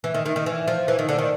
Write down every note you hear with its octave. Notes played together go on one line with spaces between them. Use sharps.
E3
D#3
D#3
D#3
E3
F3
E3
D#3
D3
D#3